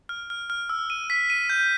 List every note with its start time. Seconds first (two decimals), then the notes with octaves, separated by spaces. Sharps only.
0.09 F6
0.30 F6
0.50 F6
0.69 E6
0.90 D#7
1.10 B6
1.30 D#7
1.50 G6